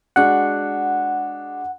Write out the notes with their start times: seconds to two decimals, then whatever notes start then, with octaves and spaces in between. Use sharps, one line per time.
0.16 G#3 D4 F#4 F#5